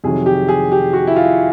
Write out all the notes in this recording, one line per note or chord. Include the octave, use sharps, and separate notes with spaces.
F2 C3 D#3 F#3 G#4
G4
G#4
G4
F#4
E4
F4